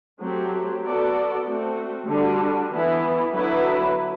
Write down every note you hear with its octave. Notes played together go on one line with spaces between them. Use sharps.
F#3 A3 C4 G4
B3 F#4 A4 D5
A3 C4 F#4
D3 G3 D4 F#4
E3 B3 E4
D3 F#3 B3 E4 B4